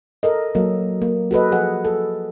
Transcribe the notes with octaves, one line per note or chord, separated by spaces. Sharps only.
A4 A#4 D#5
F#3 A#3 A4 D#5
A#3
F#4 A4 B4 D#5
F3 G#4 D#5 F#5
A4